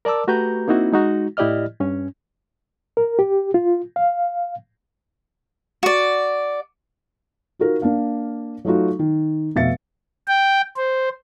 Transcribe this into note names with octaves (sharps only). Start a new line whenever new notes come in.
A#4 D5 A5 D6 E6
A3 F#4 G4 B4 A#5 G6
A#3 C4 D#4 E4 F#4
G#3 D#4 F#4
A2 E4 G4 D5 D#5 F6
G2 C#4
A#4
G4
F4
F5
F#4 D5
D#4 F4 F#4 A#4
A#3 D4 F5
F#3 A3 D#4 F4 F#4
D#3
F1 B2 E5 F5 A6 C#7
G5
C5